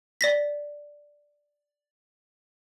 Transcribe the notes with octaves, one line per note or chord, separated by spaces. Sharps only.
D5 A#6 B6